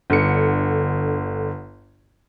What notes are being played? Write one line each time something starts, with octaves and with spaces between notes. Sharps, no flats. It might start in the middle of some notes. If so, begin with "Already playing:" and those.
G1 D3 C#7